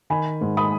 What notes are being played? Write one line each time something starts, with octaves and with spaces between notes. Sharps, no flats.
D#3 G#5 B5
G#2
B5 D#6